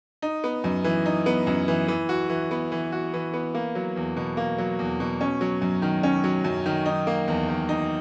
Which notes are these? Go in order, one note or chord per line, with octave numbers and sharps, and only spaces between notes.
D#4
B3
F#2
E3
D#4
B3
F#2
E3
E3
F#4
E3
B3
E3
F#4
E3
B3
A#3
F#3
E2
B2
A#3
F#3
E2
B2
C#4
F#3
F#2
D#3
C#4
F#3
F#2
D#3
D#4
A#3
E2
D#3
D#4